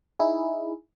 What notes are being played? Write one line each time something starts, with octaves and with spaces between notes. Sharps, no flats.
D#4 E4 G#4